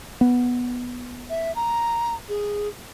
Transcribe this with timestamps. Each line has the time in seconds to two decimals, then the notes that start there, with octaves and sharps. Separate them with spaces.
0.21 B3
1.30 E5
1.56 A#5
2.29 G#4